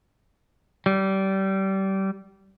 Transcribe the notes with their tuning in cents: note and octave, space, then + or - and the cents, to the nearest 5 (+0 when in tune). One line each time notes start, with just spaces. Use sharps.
G3 -25